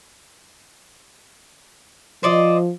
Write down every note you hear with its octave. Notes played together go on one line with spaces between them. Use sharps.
F3 C5 D5 D#5